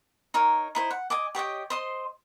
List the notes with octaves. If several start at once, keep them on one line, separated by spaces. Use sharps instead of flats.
D#4 A#4 C#5
D#4 E4 C5
F#5
D#5 G#5 D6
G4 C#5 D#5 G5
C5 D#5 C6